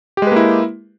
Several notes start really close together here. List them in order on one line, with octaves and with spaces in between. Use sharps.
G4 G#3 B4 A#3 E4